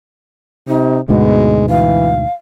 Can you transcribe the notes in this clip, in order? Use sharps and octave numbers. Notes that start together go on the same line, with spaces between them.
C3 D#4
D2 G#2 B2 G#3 B3
E3 F5